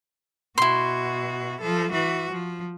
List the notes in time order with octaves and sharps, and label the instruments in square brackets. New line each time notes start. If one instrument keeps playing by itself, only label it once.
[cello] B2 F#4 [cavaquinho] E4 C6
[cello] F3 A4
E3 F#4
F3